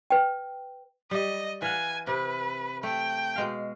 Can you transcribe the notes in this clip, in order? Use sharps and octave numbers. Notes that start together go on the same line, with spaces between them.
B4 G5
G3 D#5
E3 F5 F#5 G#5
C3 B4
A3 G5
B2 G#3 F5